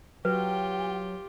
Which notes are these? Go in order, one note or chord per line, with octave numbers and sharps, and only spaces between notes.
F#3 F4 G4 B4 G5